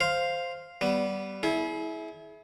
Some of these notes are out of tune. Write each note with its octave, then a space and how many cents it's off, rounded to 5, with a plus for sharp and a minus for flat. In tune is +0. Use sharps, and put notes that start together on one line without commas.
C5 +0 F5 +0
G3 -15 B3 +0
E4 -15 G#4 +35